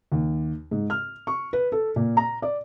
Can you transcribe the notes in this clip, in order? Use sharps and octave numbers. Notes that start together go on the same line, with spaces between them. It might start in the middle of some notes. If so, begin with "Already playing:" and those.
D#2
G#2
F6
C#6
B4
A4
A#2
A#5
D5